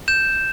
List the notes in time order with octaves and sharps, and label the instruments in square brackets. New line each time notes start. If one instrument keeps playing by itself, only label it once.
[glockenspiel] G6 E7